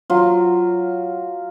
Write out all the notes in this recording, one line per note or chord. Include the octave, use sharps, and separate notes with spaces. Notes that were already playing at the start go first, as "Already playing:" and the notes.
F#3 F4